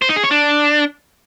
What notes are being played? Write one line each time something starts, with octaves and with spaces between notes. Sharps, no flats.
C5
D#4
G#4
C#5
D4